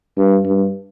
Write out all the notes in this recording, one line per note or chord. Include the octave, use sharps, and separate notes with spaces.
G2
G2